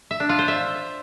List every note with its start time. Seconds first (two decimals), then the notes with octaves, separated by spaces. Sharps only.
0.11 E5
0.20 D4
0.29 F4
0.39 C5
0.48 E5